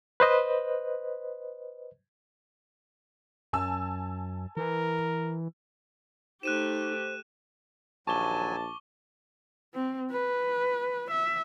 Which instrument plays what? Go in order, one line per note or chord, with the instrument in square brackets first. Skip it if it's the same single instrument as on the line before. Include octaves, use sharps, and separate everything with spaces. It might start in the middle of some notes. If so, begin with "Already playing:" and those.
[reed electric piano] B4 C5 D#5
[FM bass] F#2 [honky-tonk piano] G#5 A5 E6
[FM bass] E3 [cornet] A#4
[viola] A3 G4 [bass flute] D#4 [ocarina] C5 [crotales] F#6 D#7 E7
[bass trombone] A#1 [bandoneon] D#2 F#3 G#5 [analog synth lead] A5 [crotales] C#6 D6 G7
[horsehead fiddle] C4
B4
E5